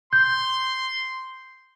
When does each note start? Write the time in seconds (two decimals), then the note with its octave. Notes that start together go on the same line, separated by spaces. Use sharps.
0.13 C6 G6